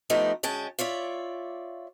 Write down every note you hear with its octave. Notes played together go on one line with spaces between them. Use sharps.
F3 A3 B3 D#4 G4
D2 G#3 C#4 G5 A5
F4 C#5 D5 E5